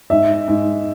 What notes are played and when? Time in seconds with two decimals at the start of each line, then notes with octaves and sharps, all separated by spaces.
0.10 G#2 E5
0.48 G#2